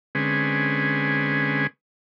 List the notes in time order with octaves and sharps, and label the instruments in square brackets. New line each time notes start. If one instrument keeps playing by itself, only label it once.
[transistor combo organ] D3 G#3 C4 C#4 G#4 B4